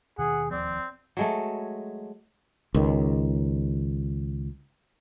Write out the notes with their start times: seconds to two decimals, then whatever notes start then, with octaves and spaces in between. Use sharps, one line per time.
0.18 D#2 B2 D#3 G#4 F#5
0.51 E1 D#2 F3 C4 D5
1.17 F#3 G#3 A3
2.74 C#2 D#3